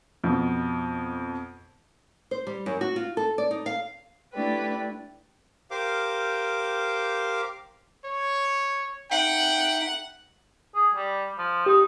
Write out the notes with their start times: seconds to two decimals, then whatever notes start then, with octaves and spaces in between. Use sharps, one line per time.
0.24 F2 B2
2.31 C5
2.47 G3
2.66 F#2
2.81 F#4
2.96 F4
3.17 A4
3.38 D5
3.51 D#4
3.66 F5
4.35 A3 D4 E4 G4 B4
5.71 G4 A#4 C5 F5 D6
8.05 C#5
9.11 D#4 E5 F#5 G5
10.75 G#4
10.95 G3
11.38 F3
11.66 D#4 G4